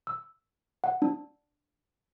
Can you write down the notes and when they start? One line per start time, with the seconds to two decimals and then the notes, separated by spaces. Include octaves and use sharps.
0.07 E6
0.84 F#5
1.02 D4